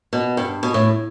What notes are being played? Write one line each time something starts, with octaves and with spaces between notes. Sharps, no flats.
B2
G2
B2
A2